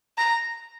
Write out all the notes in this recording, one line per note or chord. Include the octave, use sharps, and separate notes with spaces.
A#5